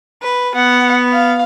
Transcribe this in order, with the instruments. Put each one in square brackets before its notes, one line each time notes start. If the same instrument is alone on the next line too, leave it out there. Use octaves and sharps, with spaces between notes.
[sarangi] B4
[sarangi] B3 [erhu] F#5
[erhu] F5